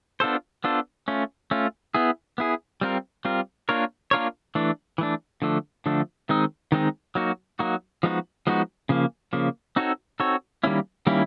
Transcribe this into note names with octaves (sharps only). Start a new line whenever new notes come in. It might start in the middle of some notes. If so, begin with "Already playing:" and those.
B3 D4 F4 A4 C5
B3 D4 F4 A4 C5
A3 C#4 F4
A3 C#4 F4
B3 E4 G#4
B3 E4 G#4
G3 C4 F4 A#4
G3 C4 F4 A#4
A#3 D4 F4 A#4 C#5
A#3 D4 F4 A#4 C#5
E3 A3 D4
E3 A3 D4
D3 F3 A3 D4
D3 F3 A3 D4
D#3 G#3 C4 D#4
D#3 G#3 C4 D#4
F#3 A#3 D#4 F#4
F#3 A#3 D#4 F#4
F3 G#3 B3 D#4 F#4
F3 G#3 B3 D#4 F#4
C#3 F3 A#3
C#3 F3 A#3
C4 D#4 F#4 A4 C#5
C4 D#4 F#4 A4 C#5
D#3 G3 A#3 C#4 E4
D#3 G3 A#3 C#4 E4